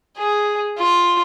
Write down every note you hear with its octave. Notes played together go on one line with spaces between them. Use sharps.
G#4
F4